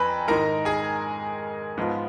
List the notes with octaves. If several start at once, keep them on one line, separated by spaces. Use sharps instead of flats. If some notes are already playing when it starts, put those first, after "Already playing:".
Already playing: F2 B4 G#5 A#5 B5
G#2 D#3 G#3 D#4 A#4 A#5
G#4 G#5
G#2 F3 G#3 B3 F4